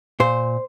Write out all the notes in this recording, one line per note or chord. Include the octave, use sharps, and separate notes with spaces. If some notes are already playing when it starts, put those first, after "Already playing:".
A#2 C5